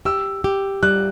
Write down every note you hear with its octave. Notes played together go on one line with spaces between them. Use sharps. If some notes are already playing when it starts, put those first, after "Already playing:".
G4 E6
G4
G3 F#6